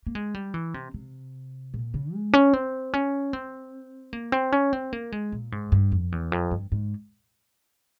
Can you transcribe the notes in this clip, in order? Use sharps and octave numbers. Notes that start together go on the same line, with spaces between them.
A#3
G#3
G3
E3
C3
C3
A#2
C#3
G#3
C#4
C4
C#4
C4
A#3
C4
C#4
C4
A#3
G#3
A#2
G#2
G2
F2
E2
F2
G2
G#2